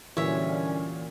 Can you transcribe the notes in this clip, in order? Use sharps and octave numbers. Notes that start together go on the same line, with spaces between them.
A#2 D3 E3 F#3 G3 C#4 C#5 E5